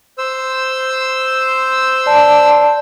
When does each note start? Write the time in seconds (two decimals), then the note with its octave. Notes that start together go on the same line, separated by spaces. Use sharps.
0.18 C5 E6
2.06 D5 A5